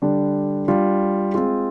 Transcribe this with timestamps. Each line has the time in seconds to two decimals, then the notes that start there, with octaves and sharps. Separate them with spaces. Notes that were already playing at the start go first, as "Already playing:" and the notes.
0.02 D3 G3 D4
0.68 G3 D4 F4
1.34 G#3 C4 F4 G#4